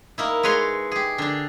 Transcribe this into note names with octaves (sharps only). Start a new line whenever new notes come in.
A#3 D#4 E4
G#3 G#4 B4 C#5 A#5 C6
G4 G#4
D3 D4